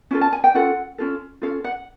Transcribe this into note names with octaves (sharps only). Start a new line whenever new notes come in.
C#4 F4 A4
A5
G#5
G5
C#4 F4 A4 F#5
C#4 F4 A4
C#4 F4 A4 F5
F#5